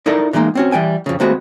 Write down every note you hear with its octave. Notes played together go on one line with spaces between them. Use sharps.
D#4 E4 A4 A#4 D5 E5
D3 E3 G#3 A#3 D#4
C4 C#4 F#4
E3 G3 G5 G#5
F2 C#3
D#2 G#3 A3 C4 F#4 B4